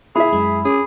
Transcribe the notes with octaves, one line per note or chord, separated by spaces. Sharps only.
E4 G#4 E5 B5
F#2 G#3
C#4 G#4 D6